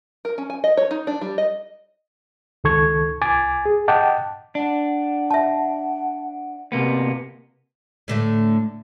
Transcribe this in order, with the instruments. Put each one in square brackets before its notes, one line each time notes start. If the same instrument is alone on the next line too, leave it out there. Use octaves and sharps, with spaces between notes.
[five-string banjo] A#4
C#4
G#5
D#5
C#5
D#4
D4
G3
D#5
[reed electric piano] C#2 D#3 A4 C#6 G#6
C2 G#5 D6 A6
G#4
D#5 F#5 G5 A5 D6
[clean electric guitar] D4 [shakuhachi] F#5
[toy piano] E5 A5
[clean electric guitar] C3 A#3 B3
[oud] A2 D3 A3